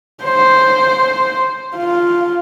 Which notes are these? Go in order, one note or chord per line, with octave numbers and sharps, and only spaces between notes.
C5
F4